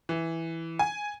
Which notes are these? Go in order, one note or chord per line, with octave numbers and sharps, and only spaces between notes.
E3
G#5